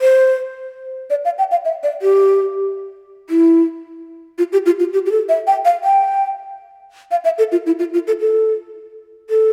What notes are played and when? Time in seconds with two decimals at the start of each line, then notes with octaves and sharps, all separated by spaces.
0.01 C5
1.10 D5
1.25 F5
1.38 G5
1.51 F5
1.65 E5
1.83 D5
2.02 G4
3.30 E4
4.38 F4
4.52 G4
4.66 F4
4.79 F4
4.93 G4
5.06 G4
5.11 A4
5.29 E5
5.47 G5
5.65 F5
5.84 G5
7.11 F5
7.24 E5
7.38 A4
7.52 F4
7.66 E4
7.79 F4
7.94 F4
8.07 A4
8.20 A4
9.30 A4